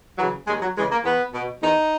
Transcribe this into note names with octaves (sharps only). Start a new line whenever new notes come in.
C#3 E3 F#3
D#2 G#3
F#3
C#3 E3 G#3
A#3
E2 B3
B2
E2 D#4